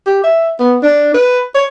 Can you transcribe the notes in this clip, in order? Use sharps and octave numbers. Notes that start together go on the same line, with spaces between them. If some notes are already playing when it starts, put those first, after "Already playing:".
G4
E5
B3
D4
B4
C#5